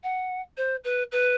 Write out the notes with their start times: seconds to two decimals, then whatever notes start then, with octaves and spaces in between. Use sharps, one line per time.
0.03 F#5
0.57 C5
0.84 B4
1.11 B4